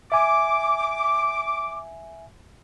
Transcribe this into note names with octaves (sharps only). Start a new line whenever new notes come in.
E5 G#5 D6